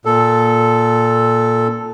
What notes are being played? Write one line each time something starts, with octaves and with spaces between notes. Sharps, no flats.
A#2 A4